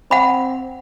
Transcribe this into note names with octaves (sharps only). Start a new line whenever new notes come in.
C4 F#5 B5